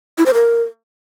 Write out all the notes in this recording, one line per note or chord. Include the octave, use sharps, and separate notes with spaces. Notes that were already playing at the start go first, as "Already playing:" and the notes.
E4
C5
A#4